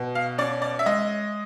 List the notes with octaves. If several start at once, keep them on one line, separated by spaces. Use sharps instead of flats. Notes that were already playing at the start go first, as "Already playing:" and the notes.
Already playing: B2
F5
C#4 D5
D5
E5
G#3 D#5